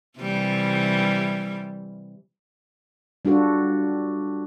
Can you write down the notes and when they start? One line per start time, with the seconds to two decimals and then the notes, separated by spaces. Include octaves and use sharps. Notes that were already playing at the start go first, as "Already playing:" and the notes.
0.19 C3 E3 G3
3.25 G3 D4 F4 F#4 A4